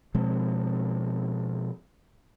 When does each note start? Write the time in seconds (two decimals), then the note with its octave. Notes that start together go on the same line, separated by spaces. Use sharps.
0.15 B2 F3 G#3 C4